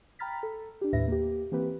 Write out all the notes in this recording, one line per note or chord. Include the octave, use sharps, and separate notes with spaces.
G5 A#5 B5 F6 A6 B6
A4
D4 G4
D#2 A2 B4 E5 A#6
A#3 G4
E3 A#3 C4 G4 B4